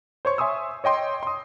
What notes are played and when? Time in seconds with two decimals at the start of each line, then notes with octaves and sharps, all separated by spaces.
0.25 C5 C#5 C#6
0.38 E5 G#5 C6 D#6 E6
0.84 C#5 D#5 G5 C6 D6
1.23 C6 D#6